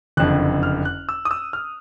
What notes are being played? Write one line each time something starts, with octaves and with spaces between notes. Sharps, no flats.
F#1 F2 D3 F#6
F6
F#6
E6
D#6
E6
F6